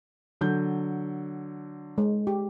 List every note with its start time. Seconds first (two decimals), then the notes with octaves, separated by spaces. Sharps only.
0.41 D3 F#3 G6
1.98 G#3
2.27 G4